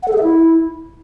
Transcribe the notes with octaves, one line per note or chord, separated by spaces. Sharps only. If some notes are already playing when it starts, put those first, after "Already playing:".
F#5
A4
G#4
E5
E4